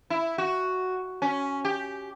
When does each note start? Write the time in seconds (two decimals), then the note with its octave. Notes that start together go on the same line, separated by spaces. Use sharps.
0.10 E4
0.38 F#4
1.22 C#4
1.65 G4